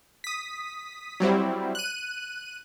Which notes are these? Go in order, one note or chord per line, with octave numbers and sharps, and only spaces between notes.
D#6 B6
F#3 G3 C4 E4
F#6 D#7